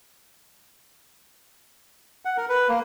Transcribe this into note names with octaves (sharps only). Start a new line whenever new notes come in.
F#5
A#4
B4
A#3